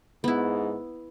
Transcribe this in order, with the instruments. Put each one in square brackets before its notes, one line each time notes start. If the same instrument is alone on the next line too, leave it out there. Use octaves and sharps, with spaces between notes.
[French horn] G#2 [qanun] B3 E4